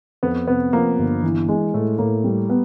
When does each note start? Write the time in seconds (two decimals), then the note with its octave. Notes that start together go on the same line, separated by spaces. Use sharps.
0.23 F2 B3
0.47 C3 B3
0.73 F3 A#3
0.98 G1
1.23 E3
1.48 G#3
1.74 A2 A3
1.98 A2 A#3
2.24 G3
2.50 B3